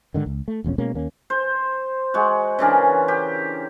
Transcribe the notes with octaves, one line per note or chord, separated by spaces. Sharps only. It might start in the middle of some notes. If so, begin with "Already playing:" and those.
G#2 D3 D#3
C#2
A3
E1 A#1 F2 C#4
B2 G#3 A#3 C#4
D#2 A#3 C#4
C5
G#3 F#4
C#3 E3 D4 A#4
G4